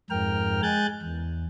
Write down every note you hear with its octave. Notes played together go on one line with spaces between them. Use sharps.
F2 G#2 A#4 G5 F6
G#3 G#5 F#6 G6 A6
E2